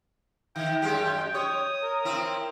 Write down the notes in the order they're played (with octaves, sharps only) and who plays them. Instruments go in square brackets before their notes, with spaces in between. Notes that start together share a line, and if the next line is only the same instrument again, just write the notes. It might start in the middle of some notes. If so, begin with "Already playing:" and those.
[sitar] D#3 [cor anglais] G5
[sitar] F#2 G#3 G4
[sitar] C#5 [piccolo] D#6
[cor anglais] A#4
[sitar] C4 E4